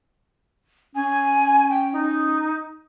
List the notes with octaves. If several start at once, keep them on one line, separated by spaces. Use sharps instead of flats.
C#4 G#5
G5
D#4